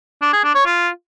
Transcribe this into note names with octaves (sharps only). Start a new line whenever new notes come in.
D4
G#4
D4
C#5
F4